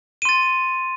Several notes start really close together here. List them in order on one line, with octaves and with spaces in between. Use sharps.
D#7 C6 A6